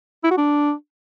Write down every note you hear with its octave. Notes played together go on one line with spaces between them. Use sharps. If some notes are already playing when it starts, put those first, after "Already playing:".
E4
F#4
D4